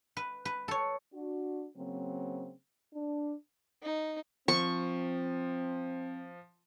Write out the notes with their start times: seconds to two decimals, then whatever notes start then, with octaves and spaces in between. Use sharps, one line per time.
0.17 B4
0.45 B4
0.68 A4 C#5
1.14 D4 F#4
1.76 C#3 F#3 A#3 C4
2.94 D4
3.83 D#4
4.48 F3 C4 C#6